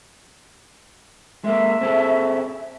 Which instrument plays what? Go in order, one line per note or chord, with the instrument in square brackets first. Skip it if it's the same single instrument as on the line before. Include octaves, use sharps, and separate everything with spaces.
[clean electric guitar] G#3 A#3 [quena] E5
[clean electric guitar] C4 G#4 A4